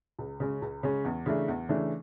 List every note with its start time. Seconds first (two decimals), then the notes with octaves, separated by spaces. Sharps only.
0.19 C#2
0.40 C#3 G#3 C#4
0.62 C#2
0.83 C#3 G#3 C#4
1.05 E2
1.26 C#3 E3 A3 D4
1.48 E2
1.69 C#3 E3 A3 D4